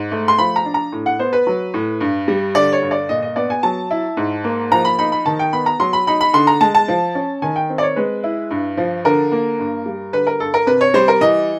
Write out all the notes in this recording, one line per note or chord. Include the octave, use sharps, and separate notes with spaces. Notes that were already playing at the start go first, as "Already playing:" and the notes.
Already playing: G#2
A3
C6
F3 B5
A#5
D4
A#5
A2
F#5
B3 C5
B4
F#3
A2
G2
G3
D3 D5
C#5
G2
D5
A#2 D#5
D#5
B3 D5
G#5
F#3 A5
E4
G#2
A#3
F3 A#5
B5
D#4 B5
B5
D#3 A5
G5
B3 B5
A#5
F#3 C6
B5
D#4 B5
B5
D3 C6
A#5
G#3 A5
A5
F3
C#4
D#3 G#5
G5
C4
D5
C#5
G#3 B4
E4
G2
F3
D3 A#4
A#3
G2
G3
D3 B4
A#4
G2 A4
A#4
C3 B4
C#5
G3 C5
A#4
E3 D#5